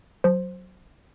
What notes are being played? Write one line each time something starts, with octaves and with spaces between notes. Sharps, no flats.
F#3 C5